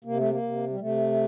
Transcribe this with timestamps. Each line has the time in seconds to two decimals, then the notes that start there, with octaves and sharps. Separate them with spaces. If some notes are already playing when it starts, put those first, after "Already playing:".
0.05 C3 A#3
0.17 A3
0.30 A#3
0.42 C3
0.69 G3
0.80 C3 A3